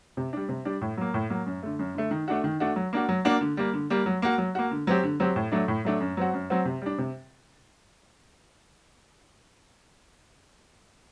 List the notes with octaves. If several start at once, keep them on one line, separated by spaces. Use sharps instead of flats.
C3
G3 D4
C3
G3 D4
A2
F#3 A#3
A2
F#3 A#3
F#2
D3 A3
F#2
D3 A3
D#3
A3 D4 F#4
D#3
A3 D4 F#4
F#3
A#3 D4 F#4
F#3
A#3 D4 F#4
D3
G3 A#3
D3
G3 A#3
F#3
A#3 F#4
F#3
A#3 F#4
D3
F#3 C4 G4
D3
F#3 C4 G4
A2
F#3 A3 D4
A2
F#3 A3 D4
F#2
F#3 C4 F#4
F#2
F#3 C4 F#4
C3
G3 D4
C3